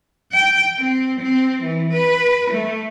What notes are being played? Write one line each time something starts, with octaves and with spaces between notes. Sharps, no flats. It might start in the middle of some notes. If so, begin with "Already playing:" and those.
G5
C4
C4
E3
B4
A3